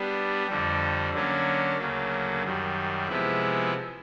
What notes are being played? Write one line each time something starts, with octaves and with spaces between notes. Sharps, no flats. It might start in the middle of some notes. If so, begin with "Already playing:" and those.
Already playing: G3 B3 D4
F2 D3 G3
D3 F#3 A#3 C#4
D2 C#3 F#3 A#3
F#2 D#3 G3
C3 F3 G#3 B3 E4